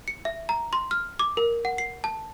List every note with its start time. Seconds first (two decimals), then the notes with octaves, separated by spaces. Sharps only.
0.08 C#7
0.25 E5
0.49 A#5
0.73 C6
0.91 F6
1.19 D6
1.37 A#4
1.65 F#5
1.78 C7
2.04 A5